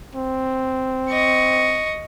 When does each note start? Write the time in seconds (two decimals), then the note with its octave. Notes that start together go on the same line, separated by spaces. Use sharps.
0.15 C4
1.10 D#5 C#6